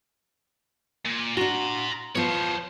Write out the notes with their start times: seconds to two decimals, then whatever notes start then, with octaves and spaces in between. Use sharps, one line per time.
1.06 A#2
1.37 D4 F#4 A#5 C6
2.15 F3 B3 C5 C#5